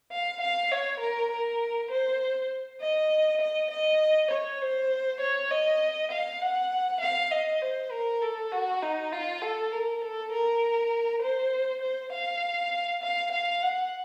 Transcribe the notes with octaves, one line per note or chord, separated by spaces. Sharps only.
F5
F5
C#5
A#4
A#4
C5
D#5
D#5
D#5
C#5
C5
C#5
D#5
F5
F#5
F5
D#5
C5
A#4
A4
F#4
D#4
F4
A4
A#4
A4
A#4
C5
C5
F5
F5
F5
F#5